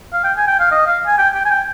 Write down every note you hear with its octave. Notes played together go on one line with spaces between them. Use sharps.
F5
G5
G#5
G5
F5
D#5
F5
G#5
G5
G5
G#5
G5